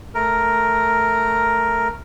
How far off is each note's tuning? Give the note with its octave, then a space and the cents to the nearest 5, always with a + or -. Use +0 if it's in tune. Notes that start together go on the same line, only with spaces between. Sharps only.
A3 -5 A#4 +0